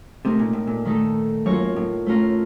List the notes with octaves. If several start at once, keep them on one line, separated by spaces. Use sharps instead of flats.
C3 A3 D#4 A#4
A#2
A2
A#2
D#3 A3 D#4 A4
F#2 A#3 F4 A#4 C#5
A2
A3 C#4 F4 A#4